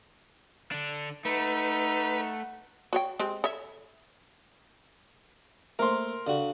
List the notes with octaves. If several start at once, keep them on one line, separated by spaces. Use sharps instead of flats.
D3 D4
A3 D#4 B4 F#5
F#4 C#5 G5
G#3 C4 G4
A4 C#5 E5
A3 A#3 A#4 C5 E5 C6
C#3 D4 F#4 A4 D5